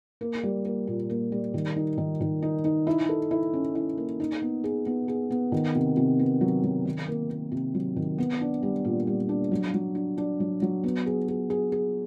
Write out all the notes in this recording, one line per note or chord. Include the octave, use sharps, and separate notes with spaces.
A#3
G3
A#3
A#2
A#3
G3
D#3
D#4
D#3
D#3
D#4
D#4
E4
A4
E4
C#4
E4
A#3
D#4
B3
G#4
B3
G#4
B3
D#3
C3
C3
B3
F#3
F#3
D#3
A#3
A#3
C3
F#3
D#3
B3
D4
G3
A#2
G3
D4
F#3
F#3
D4
D4
F#3
F#3
B3
G#4
G#4
G#4
G#4